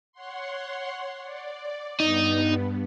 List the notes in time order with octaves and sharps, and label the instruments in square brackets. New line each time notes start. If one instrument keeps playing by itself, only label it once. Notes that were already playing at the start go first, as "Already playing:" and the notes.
[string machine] C#5 F#5 C6
D5
[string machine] G2 B3 [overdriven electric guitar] D#4